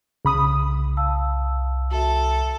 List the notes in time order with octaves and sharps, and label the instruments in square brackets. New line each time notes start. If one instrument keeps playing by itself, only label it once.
[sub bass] C2 [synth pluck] C#3 B5 D#6
[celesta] F5 A5 E6
[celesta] F#4 E5 [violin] A4